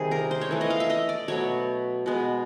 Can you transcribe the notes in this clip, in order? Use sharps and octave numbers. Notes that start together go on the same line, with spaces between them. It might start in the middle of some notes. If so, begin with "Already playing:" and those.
Already playing: C3 D#3 G3 G#4
A#4
C5
C#5
E3 A3
D#5
F5
E5
D#5
D5
B2 F#3 A3 C#5
B2 G#3 B3